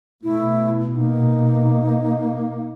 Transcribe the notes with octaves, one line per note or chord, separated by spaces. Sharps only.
B2 A3 E4
A#3 D#4